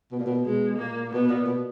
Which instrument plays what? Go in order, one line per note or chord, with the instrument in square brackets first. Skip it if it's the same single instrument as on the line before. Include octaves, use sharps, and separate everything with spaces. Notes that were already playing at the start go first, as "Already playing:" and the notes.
[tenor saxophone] B2
A#2
B2
[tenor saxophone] B2 [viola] G#3
[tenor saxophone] A#2 [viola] A#3
[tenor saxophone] B2 [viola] B3
[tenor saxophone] A#2
B2